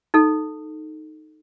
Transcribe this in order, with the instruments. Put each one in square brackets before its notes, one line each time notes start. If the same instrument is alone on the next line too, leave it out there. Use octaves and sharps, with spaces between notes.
[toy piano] D#4 A4